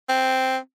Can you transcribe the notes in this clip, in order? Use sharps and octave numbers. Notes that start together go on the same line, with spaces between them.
C4